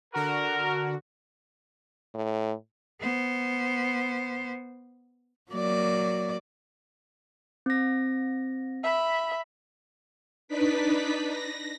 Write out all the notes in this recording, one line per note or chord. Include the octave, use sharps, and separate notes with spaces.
D3 F#4 A#4
A2
B3 C5
F#3 A#3 D5
C4 A#6
E5 B5
D4 D#4 B4 D5 B6
A#6